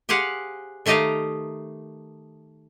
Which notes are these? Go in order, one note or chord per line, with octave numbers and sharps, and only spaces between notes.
G4 G#4 C5 F5 F#5
D#3 A3 G4 D#5 F5 A#5